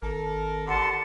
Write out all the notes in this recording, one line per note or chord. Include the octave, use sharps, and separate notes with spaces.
G#1 A4 A#4
D#2 D3 F#5 A5 C6